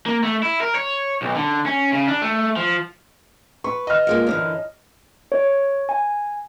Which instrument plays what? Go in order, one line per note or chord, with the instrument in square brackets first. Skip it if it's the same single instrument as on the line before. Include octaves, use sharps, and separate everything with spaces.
[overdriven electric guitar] A#3
A3
E4
A#4
C#5
B1
D3
C#4
C#3
D4
A3
F3
[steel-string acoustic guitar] B4 [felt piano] C#6
[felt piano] D#5 F6
[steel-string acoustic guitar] F3 G#3 A#3
F#2 D3 E3
[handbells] C#5
G#5